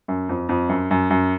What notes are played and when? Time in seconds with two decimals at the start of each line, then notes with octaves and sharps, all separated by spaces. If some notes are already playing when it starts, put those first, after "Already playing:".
0.08 F#2
0.29 F2
0.49 F2
0.69 F#2
0.91 F#2
1.10 F#2